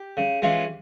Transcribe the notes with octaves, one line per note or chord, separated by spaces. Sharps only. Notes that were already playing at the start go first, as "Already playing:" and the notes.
Already playing: G4
C#3
E3 G#3 C#4 F4